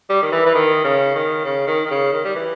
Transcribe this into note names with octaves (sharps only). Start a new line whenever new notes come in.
G3
D#3
E3
E3
D#3
C#3
D#3
C#3
D#3
D#3
C#3
D#3
G3
E3